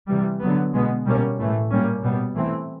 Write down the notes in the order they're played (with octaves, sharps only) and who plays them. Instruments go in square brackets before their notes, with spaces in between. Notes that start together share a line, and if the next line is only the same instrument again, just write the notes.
[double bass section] C3 E3 G3
D3 F#3 B3
B2 G#3 B3
B2 G3 A#3 C#4
A2 E3 A3
A#2 G3 A#3 C#4
B2 G3 B3
E3 A3 C4